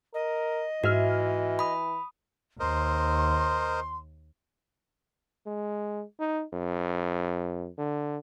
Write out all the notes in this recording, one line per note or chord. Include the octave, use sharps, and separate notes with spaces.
A#4 D#5
G#2 E3 F#4 E5 F6
B5 D#6
D#2 A#4 C5 D#5 C6
G#3
D#4
F2
D3